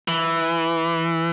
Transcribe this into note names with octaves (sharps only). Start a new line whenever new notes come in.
E3